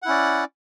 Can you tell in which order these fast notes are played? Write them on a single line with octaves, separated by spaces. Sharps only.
F#5 E4 C#4 D5